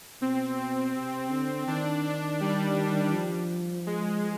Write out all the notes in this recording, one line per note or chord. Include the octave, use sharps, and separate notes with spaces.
B2 C4
C3
D3
D#3 D4
D4
G3
F3
G#3